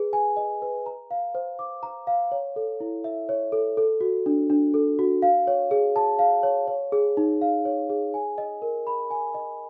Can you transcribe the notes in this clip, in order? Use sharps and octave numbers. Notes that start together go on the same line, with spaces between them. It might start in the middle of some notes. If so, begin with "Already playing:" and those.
Already playing: G#4 B4
G#5
D#5
B4
A#5
F5
C5
D6
A#5
F5
C#5
A4
E4
E5
C#5
A4
A4
F#4
D4
D4
A4
F#4
F5
C#5
G#4
A5
F5
C#5
C#5
G#4
D#4
F5
C#5
G#4
G#5
D#5
A#4
B5
G#5
D#5